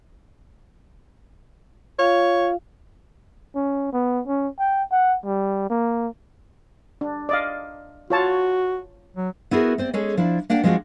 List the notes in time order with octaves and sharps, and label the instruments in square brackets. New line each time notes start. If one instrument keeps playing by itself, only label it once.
[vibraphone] F4 F5 [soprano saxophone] C#5
[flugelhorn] C#4
B3
C#4
G5
F#5
G3
A#3
[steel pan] D4
D5 D#5 F5
[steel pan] F4 C#5 A5 [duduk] F#4
[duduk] F#3
[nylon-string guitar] B3 E4 F#4 G#4 A#4
C4 C5 D5
G#3 C#4 G#4 A4 C#5
F3 D4 E4 D5
A#3 D4 D5 F#5 G5
F3 G#3 C4 D4 F4 F#4